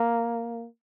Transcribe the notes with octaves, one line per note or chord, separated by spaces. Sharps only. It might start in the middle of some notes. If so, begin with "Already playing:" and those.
Already playing: A#3